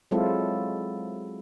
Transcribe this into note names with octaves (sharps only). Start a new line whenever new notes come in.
F#3 G#3 C4 E4 F4 A4